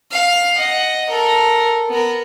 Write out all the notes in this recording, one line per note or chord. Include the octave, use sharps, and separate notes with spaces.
F5
D#5 F#5
A4 A#4
B3 A#4